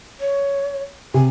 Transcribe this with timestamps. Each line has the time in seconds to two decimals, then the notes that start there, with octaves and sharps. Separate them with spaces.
0.20 C#5
1.14 C3 G#5